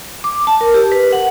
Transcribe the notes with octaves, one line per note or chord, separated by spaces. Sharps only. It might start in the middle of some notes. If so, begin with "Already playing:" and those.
D6
A5
A#4
G4
B4
F#5